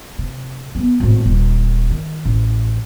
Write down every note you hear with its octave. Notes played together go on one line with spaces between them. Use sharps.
C3
A3 B3
G#1 A2
D#1
D#3
A1